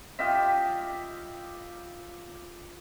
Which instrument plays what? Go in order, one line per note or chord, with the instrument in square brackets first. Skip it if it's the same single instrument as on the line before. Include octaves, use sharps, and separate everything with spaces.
[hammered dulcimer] F4 G4 D#5 E5